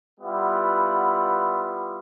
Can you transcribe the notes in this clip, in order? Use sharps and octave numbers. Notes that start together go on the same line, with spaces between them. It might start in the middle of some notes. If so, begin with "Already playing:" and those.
G3 B3 E4 F4 F#5 B5